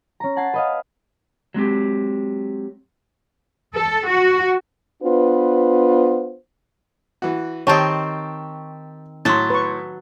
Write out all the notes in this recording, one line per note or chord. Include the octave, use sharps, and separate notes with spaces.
C#4 A#5
F#5 A5 G#6 A6 C7
B4 D#5 F5
F#3 G#3 C4 G4
A4
F#4
B3 D4 F4 B4 C5
E3 F#4
D#3 C4 G4 C#5 D#5 A5 C#6
A2 F#3 A5 C6 A6
B4 C#6